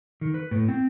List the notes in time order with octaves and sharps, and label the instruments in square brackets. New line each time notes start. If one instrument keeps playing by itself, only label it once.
[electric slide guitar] D#3
B4
A2
C4